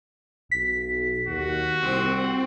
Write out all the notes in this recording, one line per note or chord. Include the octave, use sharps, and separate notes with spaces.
B1 B6
D#2 F#4
C2 C4